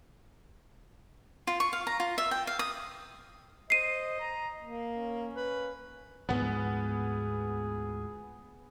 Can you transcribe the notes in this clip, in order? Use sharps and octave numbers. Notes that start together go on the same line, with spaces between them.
F4
C#6
F5
A#5
F4
E5
G5
F5
D#6
C5 D#5 C7 D#7
A#5
A#3
C#4
B4
D2 G#2 F3 B3 G#4